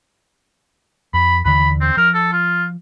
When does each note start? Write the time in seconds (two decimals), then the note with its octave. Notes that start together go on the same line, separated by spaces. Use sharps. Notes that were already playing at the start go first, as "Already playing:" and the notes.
1.13 F2 B5
1.45 D#2 D3 E3 B5
1.81 C4
1.97 F3 A#4
2.14 A4
2.33 F4